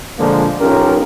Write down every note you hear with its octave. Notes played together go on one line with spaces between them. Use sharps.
A#2 D3 F3 G#3 A#3 D4
B1 C#4 F4 G4 A#4